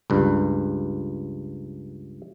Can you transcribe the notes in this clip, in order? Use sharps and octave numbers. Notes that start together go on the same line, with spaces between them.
C#2 G2